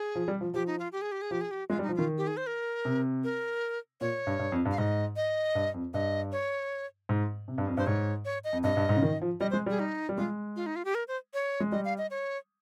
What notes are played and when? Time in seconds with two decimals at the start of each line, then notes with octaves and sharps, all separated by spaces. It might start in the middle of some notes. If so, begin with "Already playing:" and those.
Already playing: G#4
0.15 F3
0.28 G3
0.41 F3
0.54 F3 G4
0.67 D#4
0.79 F4
0.92 G4
1.02 G#4
1.12 G4
1.22 G#4
1.31 F3 G4
1.41 G#4
1.51 G4
1.69 G#3 F4
1.79 G3
1.83 D#4
1.89 F3
1.96 D#3 F4
2.18 G4
2.27 G#4
2.37 C5
2.47 A#4
2.85 C3
3.24 A#4
4.01 A#2 C#5
4.27 G2
4.39 G2
4.52 F2
4.65 G2
4.71 F5
4.78 G#2 D#5
5.16 D#5
5.55 G2
5.74 F2
5.94 G2 D#5
6.32 C#5
7.09 G#2
7.48 C3
7.58 G2
7.67 F2
7.77 G2 C5
7.87 G#2 C#5
8.25 C#5
8.44 D#5
8.53 F2
8.64 G2 D#5
8.77 G2
8.89 G#2
8.96 C#3
9.02 D#3
9.22 F3
9.40 G3 D#5
9.51 C5
9.53 G#3
9.66 G3 G#4
9.80 D#4
10.09 G3
10.18 G#3 F4
10.56 F4
10.66 D#4
10.76 F4
10.85 G4
10.95 A#4
11.08 C5
11.34 C#5
11.60 G#3
11.72 G3 D#5
11.85 F5
11.98 D#5
12.11 C#5